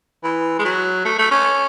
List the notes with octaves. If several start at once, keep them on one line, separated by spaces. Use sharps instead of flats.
E3
G#3
F#3
A3
A3
C#4